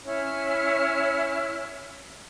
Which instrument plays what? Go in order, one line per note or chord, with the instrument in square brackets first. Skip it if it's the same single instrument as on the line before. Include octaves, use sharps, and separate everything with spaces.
[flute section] C#4 E4 C#5 F6